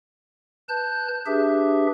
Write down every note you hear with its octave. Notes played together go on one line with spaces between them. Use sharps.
B4 A5 F#6 G6
D4 G4 G#4 B4 E5